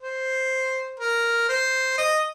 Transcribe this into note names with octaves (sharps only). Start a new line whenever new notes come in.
C5
A#4
C5
D#5